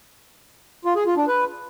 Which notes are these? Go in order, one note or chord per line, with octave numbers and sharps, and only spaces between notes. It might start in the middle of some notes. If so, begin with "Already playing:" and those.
F4
G#4
F4
D4
B4